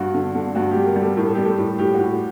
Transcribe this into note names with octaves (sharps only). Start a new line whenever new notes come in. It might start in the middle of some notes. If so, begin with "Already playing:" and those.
Already playing: G2 F#4
D3
D3
G2 F#4
G4
G3
A#4
G3
A4
A2 A#4
A4
G3 G4
A4
A2
A2 G4
F#4
A2